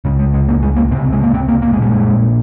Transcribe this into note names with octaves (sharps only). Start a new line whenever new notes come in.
C#2 C#3 G#3
G#3
G#3
A#3
G#3
A#3
C#2 C3 C4
G#3
A#3
C4
A#3
A#3
G#3
A#1 A#2 G3
G#3